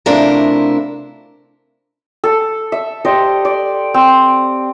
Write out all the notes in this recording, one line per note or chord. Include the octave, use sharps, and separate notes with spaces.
C3 A3 D4 E4 F4 A#4
A4
E5
G4 C5 D5 D#5
D5
C4